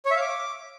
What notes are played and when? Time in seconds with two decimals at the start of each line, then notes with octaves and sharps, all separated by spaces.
0.05 C#5
0.11 E5
0.16 F5
0.21 D6